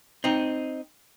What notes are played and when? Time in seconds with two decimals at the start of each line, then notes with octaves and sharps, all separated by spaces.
0.24 C4 D#4